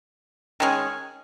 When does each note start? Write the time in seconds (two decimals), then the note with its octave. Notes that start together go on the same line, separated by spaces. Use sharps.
0.60 D#3 G#3 C#4 G#4